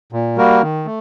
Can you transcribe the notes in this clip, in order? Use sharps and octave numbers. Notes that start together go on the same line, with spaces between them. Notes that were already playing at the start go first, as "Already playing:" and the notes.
A#2
G3 A#3 F#4 A#4
D#3
A3